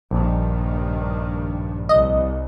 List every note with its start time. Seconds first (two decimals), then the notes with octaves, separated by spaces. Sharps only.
0.11 A#1 G2 D#3
1.89 C2 D#5